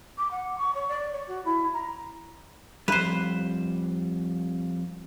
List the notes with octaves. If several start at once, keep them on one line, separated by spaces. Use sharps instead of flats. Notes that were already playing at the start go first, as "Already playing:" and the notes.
D6
F#5
C#6
C#5
D5
C#5
F#4
E4
A#5
F2 C3 G3 B4 C5